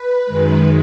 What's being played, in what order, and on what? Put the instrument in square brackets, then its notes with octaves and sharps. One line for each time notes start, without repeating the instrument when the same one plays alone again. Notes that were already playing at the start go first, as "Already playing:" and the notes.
Already playing: [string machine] B4
F#2 D#3 G#3